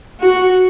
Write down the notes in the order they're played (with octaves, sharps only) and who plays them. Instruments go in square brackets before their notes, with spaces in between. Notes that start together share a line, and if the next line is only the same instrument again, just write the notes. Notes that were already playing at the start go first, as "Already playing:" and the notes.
[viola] F#4